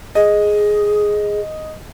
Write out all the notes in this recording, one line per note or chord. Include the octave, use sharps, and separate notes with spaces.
G#4 D#5